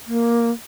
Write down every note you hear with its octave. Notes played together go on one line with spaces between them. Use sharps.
A#3